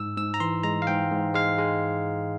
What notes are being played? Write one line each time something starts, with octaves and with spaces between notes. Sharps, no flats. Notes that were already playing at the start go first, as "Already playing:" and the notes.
Already playing: G#2 E6
G#2 E6
A#5
E3 C6
G#3 A#5
F5
G#2 G5
G#2
G#3 F5
G#3